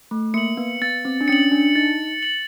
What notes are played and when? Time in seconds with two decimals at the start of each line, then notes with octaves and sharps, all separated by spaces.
0.11 A3
0.34 A#3 C#7 F#7
0.57 B3
0.82 B3 A6
1.05 C4
1.21 D4
1.28 C#4 C#7
1.33 F#7
1.52 D4
1.75 D#4 A6
2.23 C#7 F#7